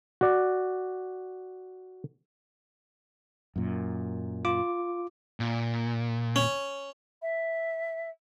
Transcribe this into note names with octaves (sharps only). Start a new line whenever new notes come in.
F#4 D5
F#2 A#2
F4 D6
A#2
C#4
E5